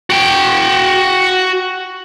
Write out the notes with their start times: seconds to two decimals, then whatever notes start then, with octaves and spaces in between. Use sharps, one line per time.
0.10 F#4 G5